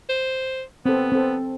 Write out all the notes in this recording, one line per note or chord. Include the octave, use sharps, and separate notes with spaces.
C5
B3 C4 A4
C4 A4